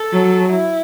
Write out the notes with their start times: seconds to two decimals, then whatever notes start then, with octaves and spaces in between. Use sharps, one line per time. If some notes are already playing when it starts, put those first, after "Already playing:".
Already playing: A4
0.13 F#3
0.49 E4